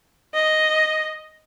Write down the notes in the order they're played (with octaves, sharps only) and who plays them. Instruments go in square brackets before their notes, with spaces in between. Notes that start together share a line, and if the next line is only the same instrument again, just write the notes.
[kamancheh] D#5